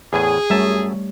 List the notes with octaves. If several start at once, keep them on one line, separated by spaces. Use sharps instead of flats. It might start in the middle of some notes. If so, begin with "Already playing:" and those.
E2 A2 G#4 G#5
F#2 G3 A3 C#5 E5 A5